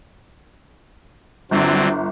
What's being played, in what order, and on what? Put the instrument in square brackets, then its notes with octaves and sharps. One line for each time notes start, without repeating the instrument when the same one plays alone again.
[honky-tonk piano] G1 [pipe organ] D3 F#3 C4